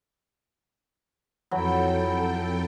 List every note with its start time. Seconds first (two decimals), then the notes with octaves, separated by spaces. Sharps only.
1.51 F2 E3 F#3 A4 G5